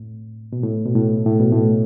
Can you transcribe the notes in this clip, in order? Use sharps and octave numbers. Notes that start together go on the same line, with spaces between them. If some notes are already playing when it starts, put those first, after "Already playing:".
Already playing: A2
B2
A2
B2
A2
A2
B2
A2